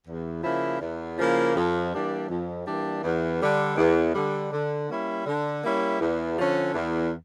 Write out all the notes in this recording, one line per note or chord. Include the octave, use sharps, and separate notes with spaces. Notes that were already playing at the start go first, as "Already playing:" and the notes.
E2
C#3 F3 A#3 E4
E2
C#3 F3 A#3 E4
F2
E3 G3 A#3 D4
F2
E3 G3 A#3 D4
E2
D3 G3
E2
D3 G3
D3
G3 A#3 C#4 E4
D3
G3 A#3 C#4 E4
E2
D3 F3 C#4
E2